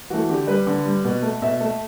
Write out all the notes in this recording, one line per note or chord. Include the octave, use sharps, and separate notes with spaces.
E3 A3 F#4
D3 G4
G3 B4
D3
G3
B2
A3
B2 E5
A3